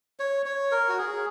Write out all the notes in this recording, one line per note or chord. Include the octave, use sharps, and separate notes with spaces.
C#5
C#5
A#4
F#4
G#4